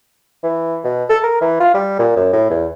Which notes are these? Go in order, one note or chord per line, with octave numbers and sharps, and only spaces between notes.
E3
B2
A4
A#4
E3
F4
G3
A#2
F#2
A2
E2